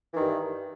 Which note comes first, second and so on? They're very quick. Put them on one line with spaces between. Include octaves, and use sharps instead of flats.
E3 D#3 G2